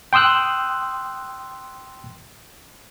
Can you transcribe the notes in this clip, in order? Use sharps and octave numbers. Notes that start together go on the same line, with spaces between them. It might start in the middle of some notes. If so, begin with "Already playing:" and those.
G5 C6 D#6 E6 F#6